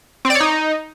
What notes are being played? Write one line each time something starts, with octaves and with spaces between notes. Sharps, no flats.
C4
D5
C#5
D#4